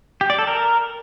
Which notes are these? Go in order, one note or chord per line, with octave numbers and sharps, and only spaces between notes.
G4
D5
A4
A#4